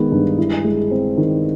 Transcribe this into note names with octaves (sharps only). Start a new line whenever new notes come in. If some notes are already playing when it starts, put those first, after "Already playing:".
Already playing: D#3 G#3 B3
G2
E4
G#3
C4
D#3